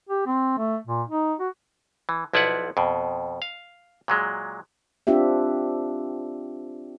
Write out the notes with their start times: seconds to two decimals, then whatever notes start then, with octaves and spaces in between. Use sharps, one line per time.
0.09 G4
0.27 C4
0.58 A3
0.87 A#2
1.09 D#4
1.40 F#4
2.09 E3
2.33 B1 F3 E4 B4 D5 F#5
2.77 F2 B2
3.42 F5
4.08 A#2 F#3 G#3
5.07 C4 D4 F4 G4 E5